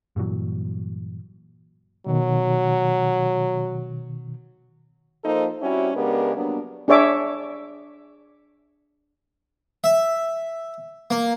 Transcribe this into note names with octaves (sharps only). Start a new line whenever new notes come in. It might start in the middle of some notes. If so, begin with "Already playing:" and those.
G2 A#2 E3 F#3
B2 D#3 F#3
F3 A#3 D#4 A4 C5
G3 C4 C#4 E4 F#4
C#3 G#3 B3 D4 G4 A#4
F#3 G3 A#3 B3 D4
D4 G#4 C#5 E5 D6
E5
A#3